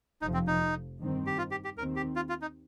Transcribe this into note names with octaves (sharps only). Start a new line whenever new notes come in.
F1 F2 F3 D#4
C4
D#4
G2 D#3 C4
G4
F4
G4
G4
D#2 D#3 C4 A#4
G4
F4
F4
D#4